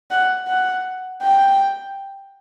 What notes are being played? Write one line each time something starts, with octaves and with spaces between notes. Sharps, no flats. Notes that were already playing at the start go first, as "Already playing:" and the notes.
F#5
F#5
G5